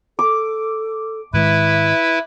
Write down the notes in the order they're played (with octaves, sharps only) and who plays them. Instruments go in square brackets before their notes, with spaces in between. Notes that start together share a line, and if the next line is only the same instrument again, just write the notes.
[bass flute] A4 [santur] D6
[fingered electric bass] G#2 D#3 G#3 [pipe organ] E4 B4 [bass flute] E5